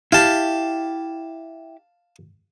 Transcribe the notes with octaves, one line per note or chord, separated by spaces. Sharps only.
E4 G4 F5 A5